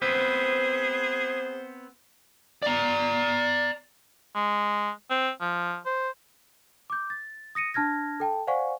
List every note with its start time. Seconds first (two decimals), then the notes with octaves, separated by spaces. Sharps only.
0.02 B3 C4 G#4 B4 C5
2.63 D5 A#5
4.35 G#3
5.10 C4
5.41 F3
5.86 C5
6.90 D6 G6
7.10 A6
7.55 D#6 A#6 C#7 D#7
7.74 D4 A5 F6 G#6 A#6
8.20 A4 G5 A5
8.47 C5 D5 F5 F#5 G#5 C#6